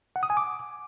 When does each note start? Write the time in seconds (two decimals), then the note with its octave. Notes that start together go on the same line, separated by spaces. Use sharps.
0.16 F#5
0.23 D#6
0.30 G#5
0.37 D6